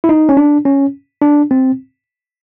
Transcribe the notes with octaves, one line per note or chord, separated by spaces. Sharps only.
E4
D#4
C#4
D4
C#4
D4
C4